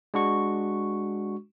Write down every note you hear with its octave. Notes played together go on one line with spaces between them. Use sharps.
G#3 D4 F#4 C#6